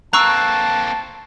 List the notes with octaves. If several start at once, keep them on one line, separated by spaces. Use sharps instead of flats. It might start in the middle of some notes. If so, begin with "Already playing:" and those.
A#3 C4 A5 A#5 C#6 E6 F#6